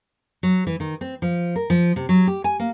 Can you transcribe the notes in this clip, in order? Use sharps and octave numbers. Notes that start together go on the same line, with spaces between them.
F#3
E3
D#3
C4
F3
A#4
F3
C3
F#3
G4
G#5
A#3